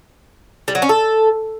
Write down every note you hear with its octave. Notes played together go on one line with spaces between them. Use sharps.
G3
F#3
C#4
A4